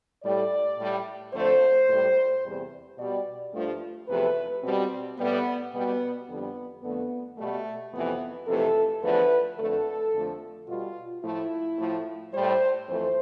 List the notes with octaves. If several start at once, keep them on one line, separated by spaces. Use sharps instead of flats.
A2 G3 D5
A2 G3
F2 D3 A3 C5
A2 G3
E2 C3 G3
B2 G3 D5
G2 F3 A3
E2 C3 F3 A3 B4
B2 G3 C4
A2 G3 B3
B2 G3 B3
F2 D3 G3 B3
F2 D3 A3 B3
B2 G3 A3
F2 C3 E3 B3
F2 C3 E3 A3 A4
E2 D3 F3 A3 B4
F2 D3 A3 A4
F2 D3 F3 A3
B2 G3 F4
A2 F3 A3 E4
A2 F3 A3
A2 G3 C5
F2 E3 A3 C5